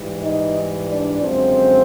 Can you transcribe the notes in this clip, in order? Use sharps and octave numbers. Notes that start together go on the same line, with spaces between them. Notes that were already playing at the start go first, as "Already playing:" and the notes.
Already playing: G#2 E3 G3
D#4 D#5
D4 D5
F#2 D3 F3 G#3 C4 C5